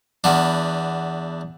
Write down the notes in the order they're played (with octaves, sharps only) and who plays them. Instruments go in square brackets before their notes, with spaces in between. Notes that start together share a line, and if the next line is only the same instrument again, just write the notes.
[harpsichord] E2 B3 D4